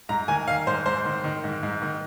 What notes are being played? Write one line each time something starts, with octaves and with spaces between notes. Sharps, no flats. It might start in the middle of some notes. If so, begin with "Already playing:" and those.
G#2 A#5
D#3 G#5
D#3 F5
G#2 C5
G#2 C5
D#3
D#3
G#2
G#2
D#3